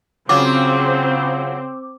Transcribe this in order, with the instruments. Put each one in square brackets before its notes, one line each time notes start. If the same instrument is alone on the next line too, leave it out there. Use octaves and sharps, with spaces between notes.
[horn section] C#3 [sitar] F#3 F4 [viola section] C4 [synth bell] D6